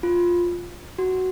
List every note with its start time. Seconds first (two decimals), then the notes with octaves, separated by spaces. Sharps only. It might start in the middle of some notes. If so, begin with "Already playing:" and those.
0.03 F4
0.98 F#4